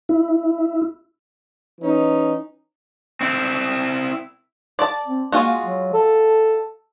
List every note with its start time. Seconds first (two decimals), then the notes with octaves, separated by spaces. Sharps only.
0.09 E4
1.80 E3 C#4 D#4
3.21 C4 E4
4.79 D5 A5
5.06 C4
5.32 G#3 A#3 F4 F#4
5.64 F#3
5.93 A4